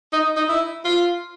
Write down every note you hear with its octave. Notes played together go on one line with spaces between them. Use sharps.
D#4
D#4
E4
F4